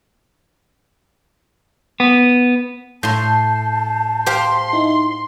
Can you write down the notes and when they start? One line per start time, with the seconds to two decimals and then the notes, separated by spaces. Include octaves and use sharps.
2.00 B3
3.03 A2 A5 C6 G6 C7
4.26 G4 C5 F5 C6
4.73 D#4 E4